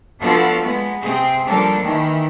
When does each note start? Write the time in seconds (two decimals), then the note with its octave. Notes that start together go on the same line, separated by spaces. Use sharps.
0.21 F3 B3 D4 F4 F#4 A4
0.62 G#3 B3
1.03 C3 C4 G#4
1.48 F3 G3 A#3 D4 A4
1.82 D#3 E3